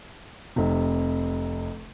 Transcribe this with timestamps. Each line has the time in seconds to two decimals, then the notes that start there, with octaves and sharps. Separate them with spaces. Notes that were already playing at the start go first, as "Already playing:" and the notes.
0.56 F1 C3